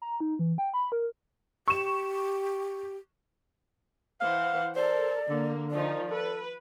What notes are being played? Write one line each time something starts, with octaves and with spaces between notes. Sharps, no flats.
A#5
D#4
E3
G5
B5
A#4
G4 C#6 E7
E3 C5 F5 F#5
A4 A#4 C5 D5
D3 A#3
D#3 F3 D#4 D5
A4 B4